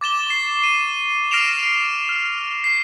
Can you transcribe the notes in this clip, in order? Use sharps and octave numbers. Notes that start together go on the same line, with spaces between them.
D6 A6 E7 G7
C#6 C7
D#7
F6 A#6 C7 D7 E7 F7
F6
C7